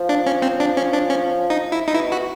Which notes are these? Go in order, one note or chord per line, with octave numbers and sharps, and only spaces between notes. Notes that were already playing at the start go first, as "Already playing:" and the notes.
Already playing: F3
D4
C#4
C4
D4
C#4
D4
C#4
D#4
E4
D#4
B2 E4
F#4